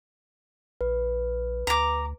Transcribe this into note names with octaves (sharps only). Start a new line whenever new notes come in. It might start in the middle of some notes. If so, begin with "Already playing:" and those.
A#1 B4
D2 A#5 D6